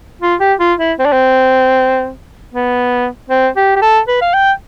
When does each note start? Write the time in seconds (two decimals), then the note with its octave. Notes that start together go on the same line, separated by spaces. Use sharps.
0.22 F4
0.40 G4
0.60 F4
0.79 E4
0.99 C4
1.05 D4
1.13 C4
2.54 B3
3.30 C4
3.56 G4
3.76 G4
3.82 A4
4.08 B4
4.21 F5
4.34 G5